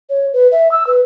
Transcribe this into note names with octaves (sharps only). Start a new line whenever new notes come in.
C#5
B4
E5
E6
B4